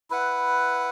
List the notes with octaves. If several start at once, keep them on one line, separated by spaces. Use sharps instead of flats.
E4 B4 F#5